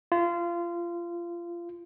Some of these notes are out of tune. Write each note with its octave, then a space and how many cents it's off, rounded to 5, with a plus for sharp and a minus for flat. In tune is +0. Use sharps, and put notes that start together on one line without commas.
F4 -25